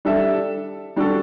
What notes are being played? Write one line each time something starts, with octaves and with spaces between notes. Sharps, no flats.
G3 D4 A4 E5
G3 D4 F#4 A4